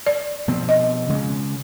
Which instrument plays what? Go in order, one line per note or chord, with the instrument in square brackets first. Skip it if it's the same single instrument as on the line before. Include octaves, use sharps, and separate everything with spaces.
[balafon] D5
[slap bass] B2 F3 C4
[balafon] D#5
[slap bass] C#3 G#3